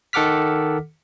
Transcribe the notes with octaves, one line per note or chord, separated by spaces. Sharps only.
D#3 A4 F#5 D6 F6 B6